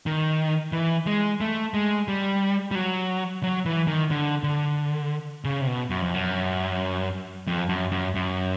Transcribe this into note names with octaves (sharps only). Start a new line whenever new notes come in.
D#3
E3
G#3
A3
G#3
G3
G3
F#3
F#3
E3
D#3
D3
D3
C#3
C3
B2
F#2
F2
F#2
F2
F#2
F#2
F#2